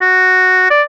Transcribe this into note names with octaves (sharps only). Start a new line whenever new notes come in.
F#4
D5